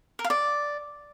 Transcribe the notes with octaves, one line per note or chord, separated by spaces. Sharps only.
A#4
F5
D5